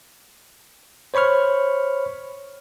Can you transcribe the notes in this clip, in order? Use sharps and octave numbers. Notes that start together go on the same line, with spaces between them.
C5 C#5 B5 C#6 F6